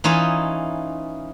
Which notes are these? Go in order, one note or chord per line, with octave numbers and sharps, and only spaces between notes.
E3 C#4 D#4 F4 G#5